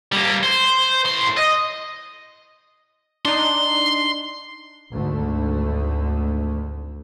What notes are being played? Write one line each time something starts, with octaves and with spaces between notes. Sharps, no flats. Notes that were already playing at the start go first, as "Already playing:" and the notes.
G3 A#3
C5
A2 C6
D#5
D4 D#4 C6
G#1 D2 D3 A3